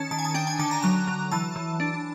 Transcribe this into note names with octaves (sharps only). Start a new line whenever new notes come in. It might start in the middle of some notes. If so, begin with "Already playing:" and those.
Already playing: D#3 C#4 A5
D#3 A5
G#5
A5
D4 G5
G#5
D3 A5
A#5
F#3 A#5
F#3
E3 A5
E3
D4